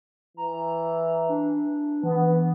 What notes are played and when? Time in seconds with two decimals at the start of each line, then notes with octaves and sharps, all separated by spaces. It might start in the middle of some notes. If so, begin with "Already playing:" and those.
0.37 E3 A#5
1.29 D4
2.03 E3 B3